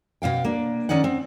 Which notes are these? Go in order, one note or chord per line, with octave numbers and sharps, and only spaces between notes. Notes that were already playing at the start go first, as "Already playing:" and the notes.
B2 F#3 F5 G5
A#3 D4
D#3 C#4 D#4 D5 F#5
C4